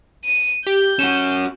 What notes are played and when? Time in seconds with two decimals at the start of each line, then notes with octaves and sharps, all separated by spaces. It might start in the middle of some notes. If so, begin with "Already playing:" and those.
0.25 D#7
0.67 G4 G6
0.99 C#4 F#4 E7